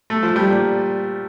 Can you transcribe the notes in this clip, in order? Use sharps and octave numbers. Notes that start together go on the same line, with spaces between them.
A3
F3
G3
A#2